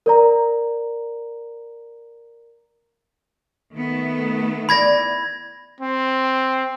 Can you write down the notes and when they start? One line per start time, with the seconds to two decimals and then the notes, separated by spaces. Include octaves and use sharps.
0.06 A#4 D5 A#5
3.73 D#3 A3 B3
4.69 E3 D5 B5 G#6 A#6
5.80 C4